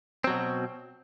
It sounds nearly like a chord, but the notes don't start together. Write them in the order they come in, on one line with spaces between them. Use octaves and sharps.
C4 F#3 B2